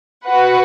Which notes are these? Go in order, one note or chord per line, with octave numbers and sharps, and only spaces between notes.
F#4 B4 F#5